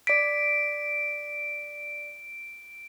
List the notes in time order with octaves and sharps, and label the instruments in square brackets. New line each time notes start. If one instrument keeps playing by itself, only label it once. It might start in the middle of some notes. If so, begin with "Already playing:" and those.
[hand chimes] D5 B6 [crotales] D7